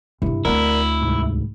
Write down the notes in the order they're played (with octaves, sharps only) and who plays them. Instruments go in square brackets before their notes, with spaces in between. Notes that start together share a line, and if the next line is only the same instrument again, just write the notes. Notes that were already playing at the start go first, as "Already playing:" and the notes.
[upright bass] G2 C3 [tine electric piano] E4
[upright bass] D2 C4 [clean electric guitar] E4 [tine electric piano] A#4 D5 F#5
[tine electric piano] C2 G#2